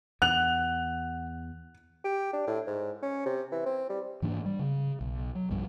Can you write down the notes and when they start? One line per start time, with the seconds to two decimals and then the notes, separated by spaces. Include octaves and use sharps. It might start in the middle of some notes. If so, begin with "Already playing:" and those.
0.22 E2 F#5 F#6 F7
2.04 G4
2.33 D4
2.47 A2
2.67 G#2
3.02 C#4
3.26 C3
3.52 E3
3.66 C4
3.89 G3
4.22 G#2 E3 A#3 D4
4.46 G3
4.59 C#3
5.01 B1
5.35 F#3
5.50 B1 G2 F3 G3